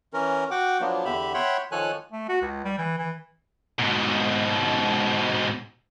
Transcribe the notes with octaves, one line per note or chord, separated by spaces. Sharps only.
E3 C#4 A#4
F#4 F#5 G5 D6
F3 F#3 A#3 B3 D4
E2 D3 G4 E5 B5
C#5 E5 F#5 G5 B5 C6
D#3 F3 A4 C#5 G#5 F#6
A3
F#4
C#2
G3
E3
E3
G#2 B2